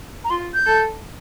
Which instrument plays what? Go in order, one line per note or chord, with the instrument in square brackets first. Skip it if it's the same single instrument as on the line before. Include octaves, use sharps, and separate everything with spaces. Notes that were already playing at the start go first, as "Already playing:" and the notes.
[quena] A#5
[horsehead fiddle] F4 [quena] C6
[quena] G6
[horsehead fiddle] A4